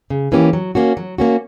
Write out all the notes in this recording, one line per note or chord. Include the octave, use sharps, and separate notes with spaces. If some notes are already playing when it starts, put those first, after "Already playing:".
C#3
E3 A#3 C#4 G4
F#3
A#3 C#4 F#4
F#3
A#3 C#4 F#4